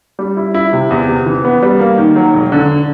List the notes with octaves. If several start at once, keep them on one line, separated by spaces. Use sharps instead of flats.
G3
E4
E4
C3
E2
C3
E3
B3
G3
A#3
D#3
F#3
E1
D3